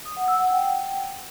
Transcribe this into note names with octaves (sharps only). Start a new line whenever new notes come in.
D#6
F#5
E6
F#5
G5